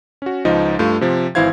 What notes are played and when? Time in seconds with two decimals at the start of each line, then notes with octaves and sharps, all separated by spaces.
0.22 C#4 F#4
0.45 C#2 F3 D#4 D#5
0.79 G2 A3 F4
1.01 C3 F3
1.35 G#1 E3 E4 C5 F5 G#6